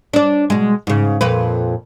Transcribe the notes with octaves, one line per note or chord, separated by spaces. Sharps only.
D4 D5
B2 G#3
G#2 C#3
F2 A#2 B4